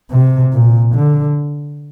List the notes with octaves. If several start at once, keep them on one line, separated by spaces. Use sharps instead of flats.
C3
A#2
D3